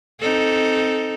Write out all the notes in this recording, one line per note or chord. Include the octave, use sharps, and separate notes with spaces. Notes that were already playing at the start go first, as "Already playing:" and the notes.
C4 D#4 A4